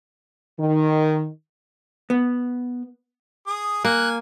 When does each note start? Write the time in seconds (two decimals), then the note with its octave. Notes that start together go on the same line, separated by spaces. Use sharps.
0.60 D#3
2.10 B3
3.47 G#4 D#6
3.85 A#3 G#5 F6 F#6